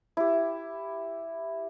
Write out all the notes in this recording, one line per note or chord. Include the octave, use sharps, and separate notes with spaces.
E4 G4